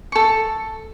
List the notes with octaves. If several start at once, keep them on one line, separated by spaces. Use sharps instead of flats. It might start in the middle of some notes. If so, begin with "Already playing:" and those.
A4 C#6